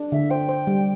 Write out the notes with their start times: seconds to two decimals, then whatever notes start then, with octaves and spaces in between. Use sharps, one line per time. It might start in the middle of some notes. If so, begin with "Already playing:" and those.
Already playing: D4
0.12 D3 E5
0.31 C5 G5
0.49 C5
0.67 G3